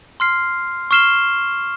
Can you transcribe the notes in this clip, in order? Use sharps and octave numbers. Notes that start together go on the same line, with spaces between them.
C6 F6 C7
C#6 F6 C7 E7 G7